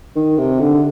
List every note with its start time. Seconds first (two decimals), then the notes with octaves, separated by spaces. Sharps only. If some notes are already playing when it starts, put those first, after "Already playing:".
0.16 D#3
0.38 C3
0.60 D3